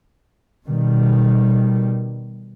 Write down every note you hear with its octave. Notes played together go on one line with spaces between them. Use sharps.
B2 D#3 G3